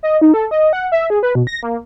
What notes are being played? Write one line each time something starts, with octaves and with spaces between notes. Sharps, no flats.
D#5
D#4
A4
D#5
F#5
E5
G#4
B4
B2
A#6
A#3